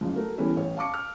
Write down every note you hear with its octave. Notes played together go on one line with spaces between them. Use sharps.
F#1 C#3 F3
A3 F#4 A#4
E3 G3 A3 B3 C#4 E4
A1 C#5
F5 A5 C#6 D6 C#7
F6